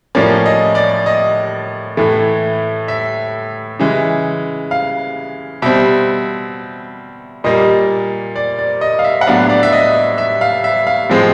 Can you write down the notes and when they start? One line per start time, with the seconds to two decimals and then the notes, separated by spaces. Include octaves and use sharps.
0.15 A2 F3 A#3 C#4 D5
0.46 D#5
0.75 D5
1.06 D#5
1.97 A2 E3 A3
2.88 E5
3.79 C#3 E3 G#3
4.71 F5
5.62 B2 G3 C4 E5
7.44 A#2 G3 A#3 D#5
8.36 D5
8.59 D5
8.81 D#5
8.99 F5
9.04 E5
9.21 F#5
9.27 A2 F#3 B3 D4 F5
9.50 D5
9.63 E5
9.73 D#5
10.18 E5
10.41 F5
10.64 E5
10.87 F5
11.10 A2 F3 G#3 C4